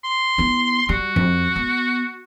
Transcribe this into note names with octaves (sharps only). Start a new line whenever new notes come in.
C6
B3 E4
G3 F#4
F2
B3